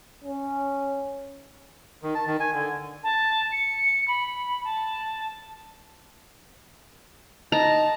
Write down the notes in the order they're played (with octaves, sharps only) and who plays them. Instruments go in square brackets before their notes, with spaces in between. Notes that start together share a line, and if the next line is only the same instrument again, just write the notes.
[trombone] C#4
[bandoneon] D#3
A5
D#3
G#5
D3
[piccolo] A5
C#7
B5
A5
[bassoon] D#4 [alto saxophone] A5 [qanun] A#5